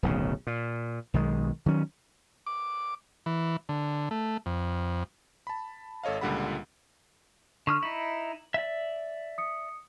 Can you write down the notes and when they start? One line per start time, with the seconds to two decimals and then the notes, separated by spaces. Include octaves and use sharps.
0.03 D1 B1 C#3
0.47 A#2
1.14 B1 D#3 G#3
1.66 D#3 F#3 C#4
2.46 D6
3.26 E3
3.69 D3
4.11 A3
4.46 F2
5.47 A5 B5
6.03 G#1 A4 C#5 D#5 F5
6.21 C#2 A#2 D3 G3 F#5 B5
7.67 D3 C#6 D#6 F6
7.83 D#4 E4 F#7
8.54 D5 E5
9.38 D#6 C#7